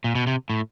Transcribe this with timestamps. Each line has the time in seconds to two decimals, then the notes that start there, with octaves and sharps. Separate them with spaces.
0.04 A#2
0.15 B2
0.27 C3
0.50 A2